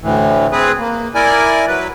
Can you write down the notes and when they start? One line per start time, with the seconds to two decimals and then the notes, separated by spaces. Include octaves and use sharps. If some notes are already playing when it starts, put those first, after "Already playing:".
0.02 D2 A2 E3
0.52 C4 G#4 B4
0.79 A#3
1.15 E4 A#4 D5 G#5
1.68 F#3 B4